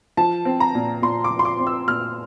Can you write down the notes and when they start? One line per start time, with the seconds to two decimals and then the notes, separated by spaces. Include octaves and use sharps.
0.17 F3 A5
0.45 C4
0.60 A#5
0.75 A#2
1.02 A#2 C6
1.24 D6
1.31 F3
1.39 C6
1.45 D6
1.59 C4
1.67 E6
1.88 A#2 F6